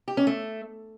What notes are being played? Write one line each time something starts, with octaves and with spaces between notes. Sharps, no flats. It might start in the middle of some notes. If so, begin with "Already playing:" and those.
G4
C#4
A3